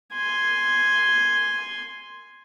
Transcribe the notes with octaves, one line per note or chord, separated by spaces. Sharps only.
G#5 C6